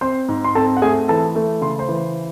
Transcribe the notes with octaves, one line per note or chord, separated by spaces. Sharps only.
C4 C5 C6
G#2
C6
C4 A4 A5
F#5
A3 G#4 G#5
E3 A4 A5
A3
C#3 C6
C5 C6
E3